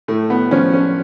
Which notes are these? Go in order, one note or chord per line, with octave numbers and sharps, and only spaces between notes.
A2 A3
B3
F3 C#4
C#4